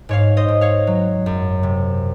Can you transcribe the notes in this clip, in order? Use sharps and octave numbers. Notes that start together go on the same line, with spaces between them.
G#2 C#5 F5
C5 D#5
G#2
C#5 F5
F#3
F#2
C3